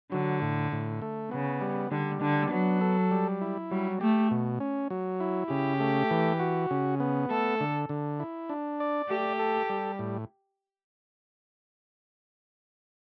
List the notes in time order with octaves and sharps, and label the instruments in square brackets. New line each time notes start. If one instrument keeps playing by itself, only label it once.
[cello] D3 [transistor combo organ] F#3
[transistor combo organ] A2
A2
A3
[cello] C#3 [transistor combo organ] B3
[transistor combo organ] G3
[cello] D3 [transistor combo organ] G3
[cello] D3 [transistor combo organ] D4
[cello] F#3 [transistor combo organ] B3
[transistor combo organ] A4
G3
E4
[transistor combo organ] F#3 [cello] G3
[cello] A3 [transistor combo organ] G4
[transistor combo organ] B2
C#4
F#3
E4
[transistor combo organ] C#3 [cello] G4
[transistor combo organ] A3
E3
F#4
C#3
B3
[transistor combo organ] A3 [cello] A4
[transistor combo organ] D3
D3
E4
D4
D5
[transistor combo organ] A3 [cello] G4
[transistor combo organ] A4
G3
A2